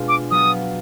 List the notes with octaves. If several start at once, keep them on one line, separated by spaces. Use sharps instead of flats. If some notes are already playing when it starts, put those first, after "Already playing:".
Already playing: B2 G#3 B3 D4 F4
D6
F#3 B3 F4 D#6